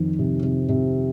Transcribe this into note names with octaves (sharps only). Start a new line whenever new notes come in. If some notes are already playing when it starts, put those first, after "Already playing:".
Already playing: F2 D#3
C3
C3
C3